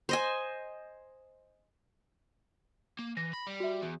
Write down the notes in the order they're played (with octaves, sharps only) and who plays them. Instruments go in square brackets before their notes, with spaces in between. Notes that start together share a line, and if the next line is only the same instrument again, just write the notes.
[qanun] C5 D#5 G#5
[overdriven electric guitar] A#3
[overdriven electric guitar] E3 [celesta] A#6
[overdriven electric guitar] B5
G3
[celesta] F#4 E5
[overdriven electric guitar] E2